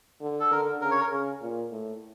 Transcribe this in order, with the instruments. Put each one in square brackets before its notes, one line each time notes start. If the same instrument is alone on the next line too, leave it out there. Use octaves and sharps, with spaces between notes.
[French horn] D3
[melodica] A4
[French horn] D3 [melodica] A#4
[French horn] C#3 [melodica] A#4
[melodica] C#5
A#4
[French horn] C#3
A#2
A2